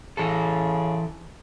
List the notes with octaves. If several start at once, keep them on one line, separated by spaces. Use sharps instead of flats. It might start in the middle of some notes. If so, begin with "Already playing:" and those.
C#3 E3 A4